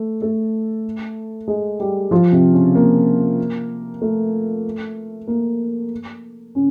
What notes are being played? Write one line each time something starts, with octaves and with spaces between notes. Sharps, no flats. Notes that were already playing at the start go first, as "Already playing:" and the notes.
Already playing: A3
A3 A4
G#3 G#4
G3 G4
F3 F4
C3 C4
C#3 C#4
A#3
A3
A#3
C#3 C#4